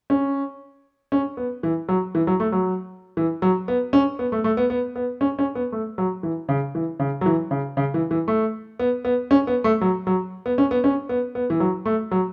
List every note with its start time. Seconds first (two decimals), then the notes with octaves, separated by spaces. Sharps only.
0.10 C#4
1.12 C#4
1.37 B3
1.63 E3
1.89 F#3
2.15 E3
2.27 F#3
2.40 A3
2.52 F#3
3.17 E3
3.42 F#3
3.68 B3
3.93 C#4
4.19 B3
4.32 A3
4.44 A3
4.57 B3
4.70 B3
4.96 B3
5.21 C#4
5.39 C#4
5.55 B3
5.72 A3
5.98 F#3
6.23 E3
6.49 C#3
6.75 E3
7.00 C#3
7.21 F#3
7.26 E3
7.51 C#3
7.77 C#3
7.94 E3
8.11 E3
8.28 A3
8.79 B3
9.05 B3
9.31 C#4
9.47 B3
9.64 A3
9.81 F#3
10.07 F#3
10.46 B3
10.58 C#4
10.71 B3
10.84 C#4
11.09 B3
11.35 B3
11.50 E3
11.60 F#3
11.86 A3
12.11 F#3